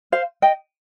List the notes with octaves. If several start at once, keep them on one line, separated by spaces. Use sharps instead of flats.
C5 F5
D#5 G5